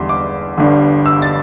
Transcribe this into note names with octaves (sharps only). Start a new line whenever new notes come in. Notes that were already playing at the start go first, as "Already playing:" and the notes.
Already playing: E2 D3 G3 C6
D6
G1 G2 D3
E6
A6